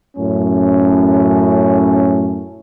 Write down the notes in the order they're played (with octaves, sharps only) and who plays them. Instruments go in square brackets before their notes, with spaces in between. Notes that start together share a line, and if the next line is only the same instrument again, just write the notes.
[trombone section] F#2 A2 C#4